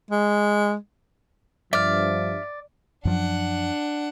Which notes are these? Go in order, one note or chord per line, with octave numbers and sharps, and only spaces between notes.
G#3
G2 F3 D5 E5 F6
F#2 F3 F#3 D4 F#5